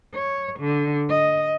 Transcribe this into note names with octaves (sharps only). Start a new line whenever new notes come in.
C#5
D3
D#5